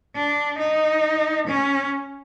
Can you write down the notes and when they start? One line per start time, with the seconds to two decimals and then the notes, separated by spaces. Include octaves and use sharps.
0.15 D4
0.59 D#4
1.47 C#4